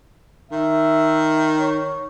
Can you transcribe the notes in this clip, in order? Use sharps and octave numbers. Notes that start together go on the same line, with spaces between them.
D#3 E5
C#5